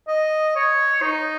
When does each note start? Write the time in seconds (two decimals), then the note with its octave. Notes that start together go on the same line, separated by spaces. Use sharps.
0.08 D#5
0.56 C#5
1.02 D#4